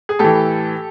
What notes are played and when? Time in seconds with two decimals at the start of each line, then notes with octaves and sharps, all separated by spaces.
0.09 G#4
0.19 A2 E3 G4 A4